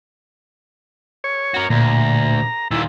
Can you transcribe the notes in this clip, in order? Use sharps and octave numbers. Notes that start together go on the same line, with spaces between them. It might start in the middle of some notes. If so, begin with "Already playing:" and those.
C#5
F#4 A#4
D2 A#2 A#5
D#2 A#2 E4